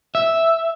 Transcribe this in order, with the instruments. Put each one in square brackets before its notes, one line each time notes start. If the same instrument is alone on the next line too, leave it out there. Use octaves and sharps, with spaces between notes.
[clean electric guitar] E5